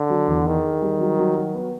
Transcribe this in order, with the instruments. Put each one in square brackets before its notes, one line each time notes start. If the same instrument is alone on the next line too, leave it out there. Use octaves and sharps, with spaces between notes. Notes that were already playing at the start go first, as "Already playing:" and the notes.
Already playing: [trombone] D3
[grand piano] F#3
E2
[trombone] D#3 [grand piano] G#4
[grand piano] G#4
G3
F#3
F#3
F#3
B3